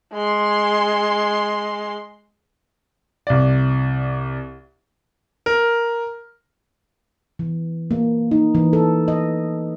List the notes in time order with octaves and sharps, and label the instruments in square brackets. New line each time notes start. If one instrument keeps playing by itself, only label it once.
[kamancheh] G#3 C6
[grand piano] C2 D5
A#4
[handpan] E3
A#3
D#4
E3
A4
D#5